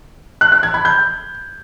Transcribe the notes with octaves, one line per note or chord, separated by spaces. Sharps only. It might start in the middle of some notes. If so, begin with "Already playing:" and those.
F#6
F#6
G#6
B5
G6